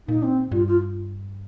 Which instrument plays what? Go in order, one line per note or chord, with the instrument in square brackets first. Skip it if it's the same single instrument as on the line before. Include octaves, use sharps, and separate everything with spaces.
[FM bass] A#2 [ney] D#4
[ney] C4
[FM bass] G2 [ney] F4
[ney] F4